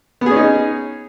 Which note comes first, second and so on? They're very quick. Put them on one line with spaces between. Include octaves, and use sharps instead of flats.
B3 G#4 C#4 D#4